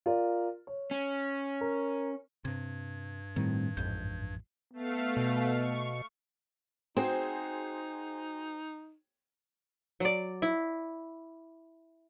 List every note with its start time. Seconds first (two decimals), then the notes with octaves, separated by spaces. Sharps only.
0.06 F4 A#4 D5
0.67 C#5
0.91 C#4
1.61 A#4
2.45 G2 C3 G#6
3.36 A2 D#3 G3 C4
3.77 A1 F2 G#2 G6
4.73 A3 B3 F5
5.17 B2
5.56 C#6
6.97 C4 D#4 F#4 G#4 C5
10.00 F#3 D5
10.42 E4